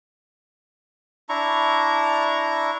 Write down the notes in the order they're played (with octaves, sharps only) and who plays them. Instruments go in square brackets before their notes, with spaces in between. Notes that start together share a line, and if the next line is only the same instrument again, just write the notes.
[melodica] D4 E4 A#5 C#6